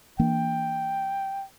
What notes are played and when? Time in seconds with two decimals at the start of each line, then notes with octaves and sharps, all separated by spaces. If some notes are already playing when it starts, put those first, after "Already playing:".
0.19 E3 A#3 D4 G5